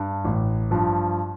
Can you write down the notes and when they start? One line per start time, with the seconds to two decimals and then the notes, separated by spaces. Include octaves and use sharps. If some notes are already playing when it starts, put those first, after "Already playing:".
Already playing: G2
0.25 A1
0.71 G2 F3